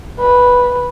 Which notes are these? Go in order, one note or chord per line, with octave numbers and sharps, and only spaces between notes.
B4